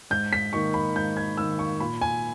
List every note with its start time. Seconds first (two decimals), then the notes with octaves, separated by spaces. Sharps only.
0.11 G#2 G6
0.33 B6
0.53 D#3 A#3 D#4 C#6
0.74 B5
0.95 G#2 G6
1.17 G#6
1.37 D#3 A#3 D#4 E6
1.59 C#6
1.80 A#2 B5
2.01 G#5